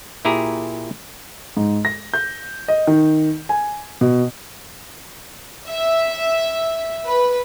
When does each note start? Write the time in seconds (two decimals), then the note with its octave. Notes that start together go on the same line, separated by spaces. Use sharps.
0.25 A#2 E4 G4 G#4 A#5
1.57 G#2
1.85 A#6
2.14 G6
2.68 D#5
2.87 D#3
3.49 G#5
4.01 B2
5.68 E5
7.06 B4